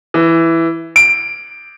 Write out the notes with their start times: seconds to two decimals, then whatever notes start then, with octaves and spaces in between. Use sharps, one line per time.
0.14 E3
0.96 D7